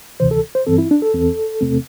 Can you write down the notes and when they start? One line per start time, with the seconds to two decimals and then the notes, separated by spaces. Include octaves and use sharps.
0.20 D2 C3 E3 C5
0.31 A4
0.55 C5
0.67 G2 E3 C4 A4
0.78 E4
0.91 D4
1.02 A4
1.14 E2 E3 C4
1.61 E2 C3 A3 C4